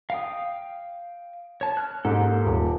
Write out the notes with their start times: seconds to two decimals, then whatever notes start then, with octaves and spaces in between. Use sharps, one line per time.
0.10 F5 G5 D#6
1.61 C#5 A5
1.77 F6 F#6
2.05 G#2 A#3 G4 A4
2.45 D#1